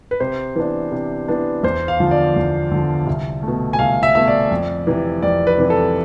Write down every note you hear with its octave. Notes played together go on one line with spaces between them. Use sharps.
B4
C3 C5
E3 B3 D4
C3
E3 B3 D4
E2 C5
F5
D3 F3
D5
E2
D3 F3
C2
B2 A3
G#5
C2 F5
E5
B2 A3 E5
D5
F2
C3 E3
F2 D5
B4
C3 E3
A4